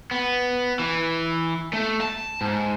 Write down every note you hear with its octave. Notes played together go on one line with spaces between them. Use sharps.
B3
E3
A3
A5
G#2